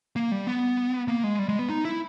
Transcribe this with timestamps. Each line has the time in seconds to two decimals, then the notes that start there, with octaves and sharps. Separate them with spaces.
0.16 A#3
0.32 G3
0.47 B3
1.08 A#3
1.24 G#3
1.39 G3
1.49 G#3
1.59 B3
1.69 D#4
1.85 E4